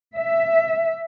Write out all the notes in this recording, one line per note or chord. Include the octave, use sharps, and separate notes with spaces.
E5